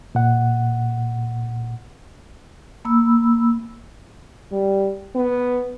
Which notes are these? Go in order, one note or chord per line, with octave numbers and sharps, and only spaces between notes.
A#2 F#5
A#3 B5 E6
G3
B3